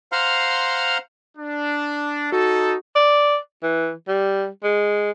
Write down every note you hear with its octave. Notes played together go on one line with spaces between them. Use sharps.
C5 F5 F#5 A#5 C6 F6
D4
D#4 F#4 A4
D5
E3
G3
G#3